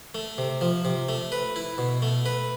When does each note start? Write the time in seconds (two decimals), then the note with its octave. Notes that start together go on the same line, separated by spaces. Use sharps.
0.15 A3
0.38 C3
0.61 F3
0.85 C3
1.09 A3
1.32 B4
1.56 E4
1.78 B2
2.02 A3
2.26 B4